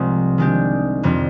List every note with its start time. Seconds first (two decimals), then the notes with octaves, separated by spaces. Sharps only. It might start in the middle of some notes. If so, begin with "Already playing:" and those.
Already playing: C2 C3 F3 G#3 C4
0.38 D#3 G#3 D4 G4
1.03 F2 C3 G3 C4